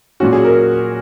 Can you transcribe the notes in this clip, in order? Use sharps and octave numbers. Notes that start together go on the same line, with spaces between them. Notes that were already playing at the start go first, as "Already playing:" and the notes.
A#2 F#3 C#4 F#4
G#4
A#4